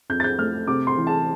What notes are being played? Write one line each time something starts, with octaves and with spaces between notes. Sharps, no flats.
F2 G6
A6
G6
A3 F6
C3 D6
C6
E3
A5